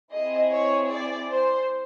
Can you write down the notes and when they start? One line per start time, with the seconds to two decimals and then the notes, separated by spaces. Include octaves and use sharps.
0.12 C4 E4 G#4 D#5
0.51 C#5
0.90 D5
1.30 C5